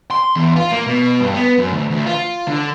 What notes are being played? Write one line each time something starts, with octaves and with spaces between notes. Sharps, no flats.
C6
E2
F4
A#3
B2
G2
B3
F#2
D2
D2
F4
D3